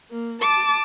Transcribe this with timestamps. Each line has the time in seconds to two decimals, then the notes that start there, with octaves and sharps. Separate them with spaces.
0.11 A#3
0.41 A5 D6